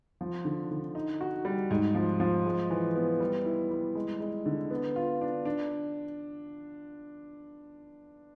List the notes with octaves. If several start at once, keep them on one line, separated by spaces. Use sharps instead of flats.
F3
D3
D3
D#4
F#4
G3
G#2
F3
F3
G#3
E3
B3
G3
E4
G3
G#3
G#3
D3
B3
F4
D4
D4